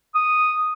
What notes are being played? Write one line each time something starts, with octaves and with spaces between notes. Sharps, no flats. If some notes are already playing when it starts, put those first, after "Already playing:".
D#6